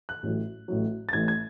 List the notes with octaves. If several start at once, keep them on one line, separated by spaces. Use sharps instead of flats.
F#6
A1 A2 F#3
A1 A2 F#3
A6
A1 A2 E3 G#6
G#6